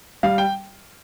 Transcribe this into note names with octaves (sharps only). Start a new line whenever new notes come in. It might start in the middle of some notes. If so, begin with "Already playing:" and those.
G3 F5
G5